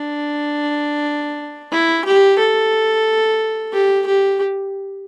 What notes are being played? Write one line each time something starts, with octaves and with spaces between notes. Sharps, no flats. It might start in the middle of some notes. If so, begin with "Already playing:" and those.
Already playing: D4
E4
G4
A4
G4
G4